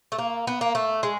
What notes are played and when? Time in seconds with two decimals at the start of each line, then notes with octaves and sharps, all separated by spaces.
0.12 A3
0.18 A#3
0.47 B3
0.61 A#3
0.75 A3
1.03 G#3